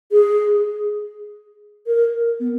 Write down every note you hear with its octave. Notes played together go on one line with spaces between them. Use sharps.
G#4
A#4
B3